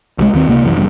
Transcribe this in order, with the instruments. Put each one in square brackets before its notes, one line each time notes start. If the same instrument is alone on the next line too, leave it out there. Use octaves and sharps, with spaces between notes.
[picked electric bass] C2 F3 G#3
D#2 D#3 C4
C#2 C3 A#3
C2 F#2 E3
F1 E2 G2